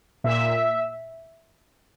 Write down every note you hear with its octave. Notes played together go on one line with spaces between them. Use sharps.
A#2 E5